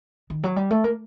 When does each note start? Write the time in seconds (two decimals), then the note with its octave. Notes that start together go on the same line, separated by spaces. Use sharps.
0.30 D#3
0.43 F#3
0.56 G3
0.70 A3
0.84 A#3